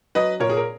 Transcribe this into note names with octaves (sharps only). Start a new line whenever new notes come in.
F#3 B4 D#5
A#2 A#4 C#5
G#4
A#4